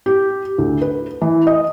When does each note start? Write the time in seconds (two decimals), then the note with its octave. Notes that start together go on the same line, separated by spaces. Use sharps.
0.06 G4
0.58 D2
0.82 B4
1.21 E3
1.47 D#5